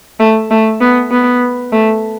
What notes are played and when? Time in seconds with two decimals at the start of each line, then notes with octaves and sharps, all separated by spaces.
0.19 A3
0.51 A3
0.81 B3
1.11 B3
1.72 A3